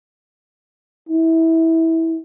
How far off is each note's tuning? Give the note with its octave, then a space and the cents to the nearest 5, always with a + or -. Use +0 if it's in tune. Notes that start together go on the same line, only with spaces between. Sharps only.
E4 -20